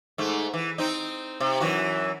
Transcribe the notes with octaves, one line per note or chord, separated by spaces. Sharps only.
G#2 A3
E3
C4 D#4
C3
F#2 E3 F#4